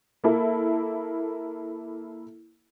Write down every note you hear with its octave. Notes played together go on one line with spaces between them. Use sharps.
A#3 E4 A4